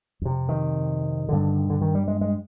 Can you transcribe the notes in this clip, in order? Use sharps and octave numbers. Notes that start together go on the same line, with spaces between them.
F2 C3
D#3
G2 D3
D3
D#3
G3
G#3
G#3